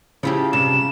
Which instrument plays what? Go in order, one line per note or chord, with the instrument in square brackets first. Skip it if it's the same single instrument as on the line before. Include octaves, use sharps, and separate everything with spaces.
[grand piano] C#3 [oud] F3 E4 G4
[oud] G2 C3 [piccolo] E7